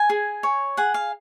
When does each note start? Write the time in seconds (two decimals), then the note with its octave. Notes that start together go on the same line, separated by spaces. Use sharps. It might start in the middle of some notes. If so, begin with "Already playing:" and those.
Already playing: G#5
0.10 G#4
0.43 C#5
0.77 G#4 F#5
0.94 F5